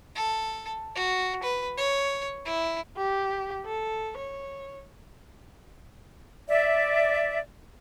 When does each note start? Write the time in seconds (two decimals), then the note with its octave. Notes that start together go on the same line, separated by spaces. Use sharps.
0.15 A4
0.96 F#4
1.43 B4
1.77 C#5
2.46 E4
2.97 G4
3.66 A4
4.17 C#5
6.49 D5 E5